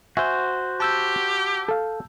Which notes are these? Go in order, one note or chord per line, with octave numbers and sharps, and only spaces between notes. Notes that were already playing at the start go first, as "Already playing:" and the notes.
F#4 C5 E5 G#5
G4 A5 E6 G6
A4 F5